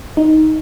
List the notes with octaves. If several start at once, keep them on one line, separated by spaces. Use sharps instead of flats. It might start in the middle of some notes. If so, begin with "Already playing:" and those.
D#4